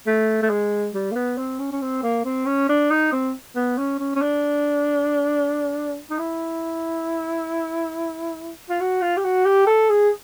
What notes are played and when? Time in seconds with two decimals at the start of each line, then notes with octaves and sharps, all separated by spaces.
0.07 A3
0.42 A3
0.50 G#3
0.94 G3
1.11 A#3
1.15 B3
1.38 C4
1.59 C#4
1.72 C#4
1.82 C4
2.03 A#3
2.25 C4
2.46 C#4
2.69 D4
2.91 D#4
3.12 C4
3.56 B3
3.78 C#4
3.99 C#4
4.15 C#4
4.21 D4
6.11 D#4
6.18 E4
8.69 F4
8.80 F#4
9.02 F4
9.17 G4
9.24 F#4
9.45 G4
9.67 A4
9.90 G#4